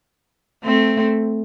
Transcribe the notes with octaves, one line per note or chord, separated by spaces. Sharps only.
A3 C4